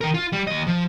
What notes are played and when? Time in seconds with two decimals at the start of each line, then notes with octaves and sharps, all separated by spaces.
0.01 D#3 A#4
0.14 F4
0.32 G3
0.47 D#2 D#5
0.67 F3